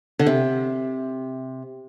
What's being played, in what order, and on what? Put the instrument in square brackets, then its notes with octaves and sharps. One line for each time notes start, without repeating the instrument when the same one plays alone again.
[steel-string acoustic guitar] D3
C3